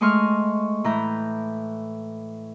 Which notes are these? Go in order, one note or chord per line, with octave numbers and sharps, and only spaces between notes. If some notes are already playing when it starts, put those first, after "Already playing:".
G#3 A3 D#5 C6 C#6 F6
A2 E3 A#5 B5 G6